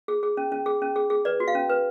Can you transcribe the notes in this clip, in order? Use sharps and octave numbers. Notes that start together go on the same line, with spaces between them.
G#4
G#4
C#4
C#4
G#4
C#4
G#4
G#4
B4 D5
F#4
F5
C#4
B4